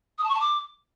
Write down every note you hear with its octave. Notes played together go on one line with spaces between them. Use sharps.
D#6
A5
C#6
A5
D6